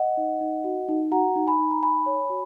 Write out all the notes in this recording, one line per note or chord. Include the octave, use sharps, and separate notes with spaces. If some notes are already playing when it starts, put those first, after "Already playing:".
Already playing: D#5 F#5
D#4
D#4
F#4
D#4
F#4 F#5 A#5
D#4
G#5 B5
D#4
A#5
D#4 G#5 B5
C#5
F#4